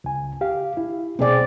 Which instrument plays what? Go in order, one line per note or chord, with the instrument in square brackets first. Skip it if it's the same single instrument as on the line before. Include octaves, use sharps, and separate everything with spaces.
[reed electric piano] C#2 G#5
G4 F5
E4
[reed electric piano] C2 B2 G#4 [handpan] C4 D5